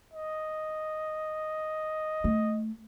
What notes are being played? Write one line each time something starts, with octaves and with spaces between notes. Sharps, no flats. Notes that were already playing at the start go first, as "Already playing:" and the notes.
D#5
A3